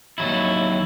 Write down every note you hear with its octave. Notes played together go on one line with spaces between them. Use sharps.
D#2 F#3 E4